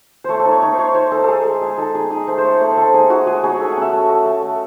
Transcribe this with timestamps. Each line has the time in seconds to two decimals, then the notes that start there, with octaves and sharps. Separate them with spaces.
0.24 A3 C5 C#5
0.39 A4
0.45 D#4
0.51 C#5
0.62 D#4 C#5
0.73 C5
0.78 D#4 C#5
0.95 D#4 C5
1.12 D#4 A4
1.24 D#4 G#4 A4
1.45 G#3
1.61 G#3 G#4
1.78 D#4 A4
1.95 D#4 G#4
2.11 D#4 G#4
2.27 A3 C5
2.38 C5
2.44 A3 C#5
2.60 A3 C#5
2.71 C5
2.77 A3 A4
2.94 D#4 G#4
3.10 D#4 F#4
3.27 G#3 G#4
3.35 F#4
3.44 D#4 G#4
3.51 C#5
3.60 A3 E5
3.72 F#5
3.77 C#4 E5
3.93 A3
4.09 A3 D#5
4.26 A3
4.42 A3